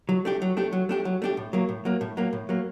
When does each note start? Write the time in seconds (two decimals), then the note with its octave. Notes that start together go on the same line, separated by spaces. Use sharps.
0.09 F#3
0.25 A3 D4 G4
0.42 F#3
0.57 A3 D4 G4
0.73 F#3
0.89 A3 D4 G4
1.05 F#3
1.22 A3 D4 G4
1.37 A2
1.53 F#3 A#3
1.69 A2
1.85 F#3 A#3
2.01 A2
2.17 F#3 A#3
2.33 A2
2.49 F#3 A#3